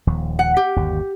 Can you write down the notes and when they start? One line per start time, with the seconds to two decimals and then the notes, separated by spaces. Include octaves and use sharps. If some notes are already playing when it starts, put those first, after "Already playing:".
0.07 D#1 D#2 F3
0.39 F#5
0.57 G4
0.76 G1 D#2